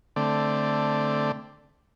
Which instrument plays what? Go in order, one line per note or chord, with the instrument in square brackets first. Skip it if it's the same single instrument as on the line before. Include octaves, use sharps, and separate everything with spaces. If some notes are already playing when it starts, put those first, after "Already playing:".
[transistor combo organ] D3 A3 C4 D5